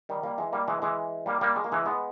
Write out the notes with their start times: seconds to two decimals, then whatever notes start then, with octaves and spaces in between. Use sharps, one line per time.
0.09 D#3 G3
0.23 G3 A#3
0.38 E3 G#3
0.52 G3 A#3
0.68 E3 G#3
0.82 E3 G#3
1.26 G3 A#3
1.41 G3 A#3
1.56 G#3
1.64 A#3
1.72 E3 G#3
1.86 G#3 B3